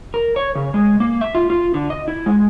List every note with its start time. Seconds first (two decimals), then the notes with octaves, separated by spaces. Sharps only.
0.14 A#4
0.36 C#5
0.55 C#3
0.74 G#3
1.00 A#3
1.21 E5
1.35 F4
1.50 F4
1.74 D3
1.90 D#5
2.08 E4
2.26 G#3